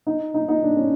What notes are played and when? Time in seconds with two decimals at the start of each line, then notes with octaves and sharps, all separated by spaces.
0.07 D#4
0.34 D#4
0.49 D#4
0.63 D4
0.76 C#4